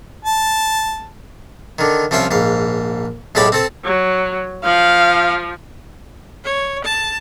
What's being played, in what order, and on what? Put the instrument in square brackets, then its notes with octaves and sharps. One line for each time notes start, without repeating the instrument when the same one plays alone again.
[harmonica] A5
[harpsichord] D3 D#3
C2 F3 C#4 F4 E5 F5
A#1 G#2 F5
B1 A2 G#3 G4 D5 B5
C4 A4 C5
[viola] F#3
[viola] F3 [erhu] F5
[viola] C#5
A5